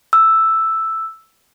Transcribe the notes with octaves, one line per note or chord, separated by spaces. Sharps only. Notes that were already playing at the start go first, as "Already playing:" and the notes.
E6